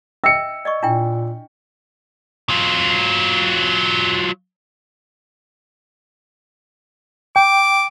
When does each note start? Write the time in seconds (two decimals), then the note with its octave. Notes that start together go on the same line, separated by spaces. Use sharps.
0.24 D#5 E5 G5 E6 C#7
0.65 D5 D#5 C#6
0.83 A#2 D4 E4 G5
2.50 F#3 F4
7.36 G5 D6